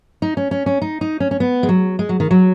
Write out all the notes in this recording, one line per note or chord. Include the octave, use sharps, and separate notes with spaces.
D#4
C#4
C#4
C#4
D#4
D#4
C#4
C#4
B3
G#3
F#3
G#3
F#3
D#3
F#3